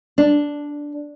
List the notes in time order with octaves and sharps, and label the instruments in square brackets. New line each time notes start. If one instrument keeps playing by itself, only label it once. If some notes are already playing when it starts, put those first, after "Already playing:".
[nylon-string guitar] D4